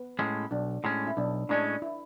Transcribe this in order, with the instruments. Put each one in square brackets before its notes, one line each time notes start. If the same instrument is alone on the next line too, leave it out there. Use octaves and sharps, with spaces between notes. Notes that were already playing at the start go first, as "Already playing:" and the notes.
Already playing: [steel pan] B3
[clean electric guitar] A2 G#3 C#4
[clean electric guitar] B1 [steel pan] D4
[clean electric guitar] A2 G#3 C#4
[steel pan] E4
[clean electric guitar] B1 [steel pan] D4
[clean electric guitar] A2 G#3 C#4 [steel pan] D4
[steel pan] E4